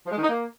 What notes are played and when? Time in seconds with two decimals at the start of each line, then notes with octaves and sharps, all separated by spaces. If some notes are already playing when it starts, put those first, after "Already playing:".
0.06 F3
0.11 G#3
0.17 D#3
0.23 D#4
0.29 A#3